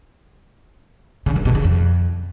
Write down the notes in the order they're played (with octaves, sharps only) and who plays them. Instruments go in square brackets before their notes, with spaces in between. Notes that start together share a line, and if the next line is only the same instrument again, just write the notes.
[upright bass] C#3
D#3
B2
C#3
F2